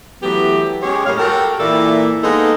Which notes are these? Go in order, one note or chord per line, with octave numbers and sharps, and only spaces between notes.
E3 F#3 A3 B3 G4
G#3 C#4 G4 G#4 C#5
A2 G3 A#3 F5
F#4 G4 A4 A#4
A#2 E3 A#3 A4 D5 E5
G#3 A#3 B3 D#4 A4 B4